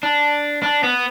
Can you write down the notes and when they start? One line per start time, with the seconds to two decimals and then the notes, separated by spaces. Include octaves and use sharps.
0.03 D4
0.63 D4
0.83 B3